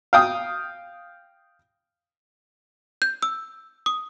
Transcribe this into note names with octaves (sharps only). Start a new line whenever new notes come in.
F5 G5 D#6
G6
E6
D#6